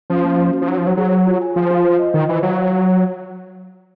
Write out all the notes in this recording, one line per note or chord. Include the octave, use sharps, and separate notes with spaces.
F3 C#4
A#3
C#4
F#4
F3
F#3 D#4
F3
F#3 C5
F#3 G#4
G#4
F4
G#5
F3 F4
F4
C5
D#5
D#3 F4
E3 C5
F#3 F5